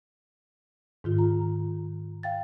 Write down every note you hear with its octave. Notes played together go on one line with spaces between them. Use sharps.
G#2 D#3 F4
A#5
F5 G5 A6